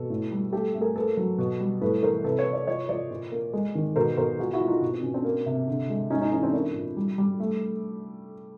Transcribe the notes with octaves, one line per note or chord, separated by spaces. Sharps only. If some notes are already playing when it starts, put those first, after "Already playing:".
Already playing: B2 A4
A2
G3
A3 G4 A4
A3
G#4 A#4
A#3 A4 B4
F#3
B2
G3
A2 A4 B4
E3 A#4 C5
C3 A4 B4
B4 C#5
C3
C5 D5
F3 C#5 D#5
F3 C5 D5
A#2
A#3
G#3
D#3
B2 A#4 C5
B2 A#4 C5
F3 F#4 G#4
E4 F#4
F3
D#4 F4
B2
C4
B2 C#4
C4 D4
A#3
C3
D3
G#3
G#3 C#4 D#4
C#4 D#4
E3 C#4 D#4
C4 D4
A#3 D4 E4
A#2
G3
G3
A3